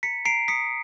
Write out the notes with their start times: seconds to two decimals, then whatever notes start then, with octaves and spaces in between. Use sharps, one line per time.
0.03 A#5 B6 C#7
0.25 A#5 C7 D7
0.48 D#6 B6 C#7